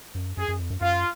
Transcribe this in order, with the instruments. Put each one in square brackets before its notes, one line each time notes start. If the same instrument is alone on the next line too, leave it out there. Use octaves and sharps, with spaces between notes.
[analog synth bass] F#2
[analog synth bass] F#2 [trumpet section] G#4
[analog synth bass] F#2
F2
F#2
[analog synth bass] F#2 [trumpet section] F4